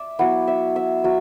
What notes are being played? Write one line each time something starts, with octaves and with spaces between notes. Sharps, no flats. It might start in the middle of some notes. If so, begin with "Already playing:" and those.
Already playing: D5 E5
F#3 B3 E4 F#5
E5
E5
F#3 E5